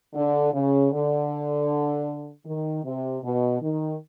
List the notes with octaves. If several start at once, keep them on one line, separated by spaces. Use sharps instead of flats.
D3
C#3
D3
D#3
C3
B2
D#3